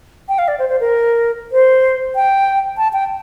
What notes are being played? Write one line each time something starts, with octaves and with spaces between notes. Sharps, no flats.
G5
F5
D5
C5
C5
A#4
C5
G5
A5
G5